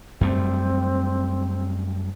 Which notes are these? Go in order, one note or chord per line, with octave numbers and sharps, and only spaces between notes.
F#2 G3 A3 C4